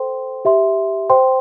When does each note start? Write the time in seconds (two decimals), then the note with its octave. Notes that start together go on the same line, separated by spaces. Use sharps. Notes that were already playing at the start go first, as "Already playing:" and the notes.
Already playing: A4 C5 G5 C6
0.45 G4 E5 C6
1.10 C5 G5 C6